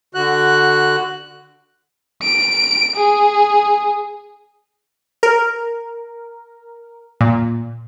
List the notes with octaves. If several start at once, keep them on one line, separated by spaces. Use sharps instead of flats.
D3 F#4 F#6
D7
G#4
A#4
A#2